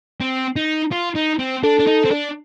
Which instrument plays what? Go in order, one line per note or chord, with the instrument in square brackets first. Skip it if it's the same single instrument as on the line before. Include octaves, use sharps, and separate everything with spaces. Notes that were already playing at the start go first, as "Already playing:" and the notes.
[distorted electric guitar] C4
D#4
F4
D#4
C4
[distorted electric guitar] D4 [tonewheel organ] A4
[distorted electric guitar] D4
D#4
C4
D4